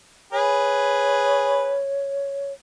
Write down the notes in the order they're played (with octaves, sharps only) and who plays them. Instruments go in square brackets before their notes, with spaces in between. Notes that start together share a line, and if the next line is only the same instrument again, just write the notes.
[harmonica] G#4 B4 [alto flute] C#5